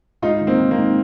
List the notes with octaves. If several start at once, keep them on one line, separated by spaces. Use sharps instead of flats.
G#2 D#4 F4
D#3
A#3 C4
D#3
A#3 C4
G#2